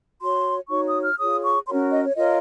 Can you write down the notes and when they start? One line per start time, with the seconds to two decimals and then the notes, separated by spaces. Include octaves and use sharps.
0.21 F#4 C#5 C6
0.69 D#4 F#4 C#5 C#6
0.86 D#6
1.02 F6
1.17 F4 G#4 C#5 D#6
1.42 C#6
1.66 C#4 F#4 A#4 C#5 C6
1.90 D#5
2.03 C#5
2.15 F4 A#4 C#5 D#5